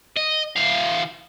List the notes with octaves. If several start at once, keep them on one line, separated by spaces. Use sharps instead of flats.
D#5
E3 F5